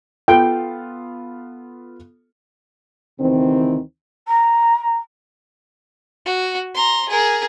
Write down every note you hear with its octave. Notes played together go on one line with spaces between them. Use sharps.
B3 F4 A4 G5
D2 C3 D#3 E3 C4
A#5
F#4
A#5 C6
G#4 A#4